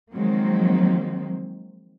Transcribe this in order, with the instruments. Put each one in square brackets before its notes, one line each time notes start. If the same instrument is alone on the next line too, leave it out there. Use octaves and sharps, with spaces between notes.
[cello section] D#3 F3 F#3 G#3 A#3 C4